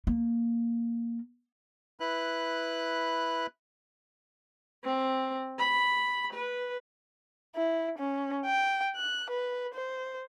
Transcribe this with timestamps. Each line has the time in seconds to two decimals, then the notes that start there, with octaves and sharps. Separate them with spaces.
0.07 A#3
2.00 E4 B4 F#6
4.84 C4
5.59 B5
6.33 B4
7.56 E4
7.99 C#4
8.46 G5
8.96 F#6
9.31 B4
9.74 C5